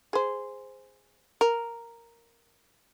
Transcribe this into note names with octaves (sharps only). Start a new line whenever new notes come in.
G#4 C5
A#4